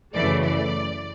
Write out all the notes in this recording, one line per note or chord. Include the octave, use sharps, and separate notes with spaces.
F#2 C#3 E3 A3 D5
D5